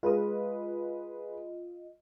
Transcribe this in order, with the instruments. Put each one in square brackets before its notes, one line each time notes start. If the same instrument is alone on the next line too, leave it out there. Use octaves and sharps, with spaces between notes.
[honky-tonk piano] G#3 B4 [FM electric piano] F4 D#5